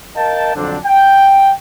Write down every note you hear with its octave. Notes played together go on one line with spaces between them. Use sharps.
A#4 D#5 F5 G5 A5
F2 D3 F#3 C4 D4
G5